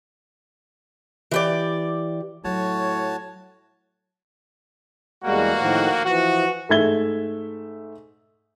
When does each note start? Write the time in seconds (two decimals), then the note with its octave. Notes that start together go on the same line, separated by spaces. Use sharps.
1.31 E3 G4 D5
2.44 A2 F#3 F#4 C#5 A5
5.24 E2 G3 G#3 A#3 F#4
5.57 A2 D#3 F3
6.05 E3 F3 F#4
6.69 G#2 A3 E5 G#6 G7